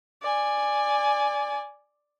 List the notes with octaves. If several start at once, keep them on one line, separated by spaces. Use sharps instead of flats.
D5 G#5